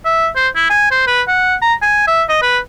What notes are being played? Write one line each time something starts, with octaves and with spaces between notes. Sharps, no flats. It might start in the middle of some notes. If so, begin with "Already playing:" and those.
E5
C5
E4
G#5
C5
B4
F#5
A#5
G#5
E5
D#5
B4